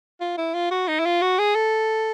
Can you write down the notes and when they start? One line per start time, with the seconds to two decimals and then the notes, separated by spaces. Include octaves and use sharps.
0.20 F4
0.37 E4
0.54 F4
0.71 F#4
0.88 D#4
1.00 E4
1.05 F4
1.22 F#4
1.39 G#4
1.55 A4